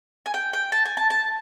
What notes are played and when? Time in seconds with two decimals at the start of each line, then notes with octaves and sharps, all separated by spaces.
0.26 G#5
0.34 G5
0.53 G5
0.72 A5
0.85 G#5
0.97 A5
1.10 A5